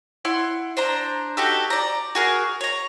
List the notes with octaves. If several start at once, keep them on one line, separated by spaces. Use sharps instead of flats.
E4 F#5 C6
D4 C5 A#5
D#4 F#4 G4 A4
D5 A#5
F#4 G#4 A#4
C#5 A#5